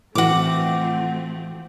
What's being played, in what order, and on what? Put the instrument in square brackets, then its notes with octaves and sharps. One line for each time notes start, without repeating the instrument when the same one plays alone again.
[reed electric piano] A2 E3 [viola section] F3 A3 C4 [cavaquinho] F#4 D6